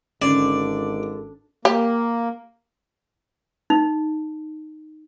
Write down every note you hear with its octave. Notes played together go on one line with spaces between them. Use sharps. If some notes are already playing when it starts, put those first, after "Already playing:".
G#1 D3 C#4 D5
A#3 G4
D#4